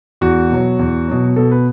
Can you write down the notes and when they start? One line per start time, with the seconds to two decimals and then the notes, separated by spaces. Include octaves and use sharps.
0.21 E2 F#4
0.50 B2 F#3
0.79 E2
1.08 B2 F#3
1.36 B2 A4
1.52 B4